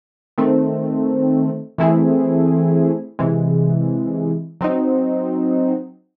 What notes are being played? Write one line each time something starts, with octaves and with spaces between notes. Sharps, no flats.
D#3 A3 C4
E3 A3 C4 E4 G#4
C3 E3 G#3
F#3 C4 D#4